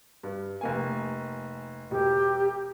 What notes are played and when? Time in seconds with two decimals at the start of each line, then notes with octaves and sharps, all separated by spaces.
0.23 G2
0.61 F1 A#3 G#5
1.91 E1 G4